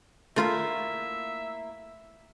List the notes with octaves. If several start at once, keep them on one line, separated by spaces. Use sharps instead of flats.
A3 A#3 E4 F4 E5